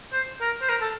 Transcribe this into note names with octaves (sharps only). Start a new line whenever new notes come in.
C5
A#4
C5
A#4
A4